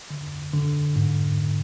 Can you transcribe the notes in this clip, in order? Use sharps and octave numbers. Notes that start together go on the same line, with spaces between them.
D3
D3
G#2